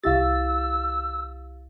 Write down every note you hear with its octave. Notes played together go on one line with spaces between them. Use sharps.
C2 E4 G4 F5 E6 A6